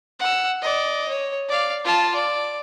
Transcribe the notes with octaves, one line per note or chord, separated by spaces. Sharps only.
F#5 E6
D5 D#5
C#5
D5 F5
F4 A5
D5